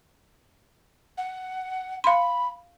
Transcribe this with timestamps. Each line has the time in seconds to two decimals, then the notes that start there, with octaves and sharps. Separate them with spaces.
1.18 F#5
2.04 F5 B5 C6